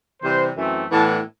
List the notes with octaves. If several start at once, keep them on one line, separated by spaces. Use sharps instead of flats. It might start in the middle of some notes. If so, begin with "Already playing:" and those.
C3 E3 G3 C5
F#2 E3 A3 C4
A2 E3 B3 D4 A5